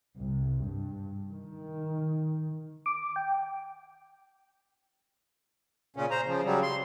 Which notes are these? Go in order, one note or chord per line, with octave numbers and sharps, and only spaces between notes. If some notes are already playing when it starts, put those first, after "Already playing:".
C2
G2
D#3
D6
G5
A#2 C#3 C#4
C5 A#5
C#3 F3
C#3 F#3 G3
C6